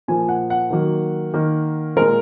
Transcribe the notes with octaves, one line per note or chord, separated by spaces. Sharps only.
A#2 F3 A#3 G#5
F#5
F#5
D#3 F#3 A#3
D#3 A#3
A#2 G#3 A#4